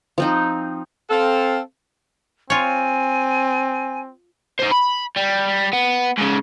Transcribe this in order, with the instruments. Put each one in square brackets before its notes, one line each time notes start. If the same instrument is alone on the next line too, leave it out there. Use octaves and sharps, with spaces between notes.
[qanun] F3 C4 D#4
[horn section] C4 A4 F5
[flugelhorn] C4 [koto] F4 C#5 [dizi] G#5
[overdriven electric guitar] D#4 C5
B5
G3
B3
G#2 C#3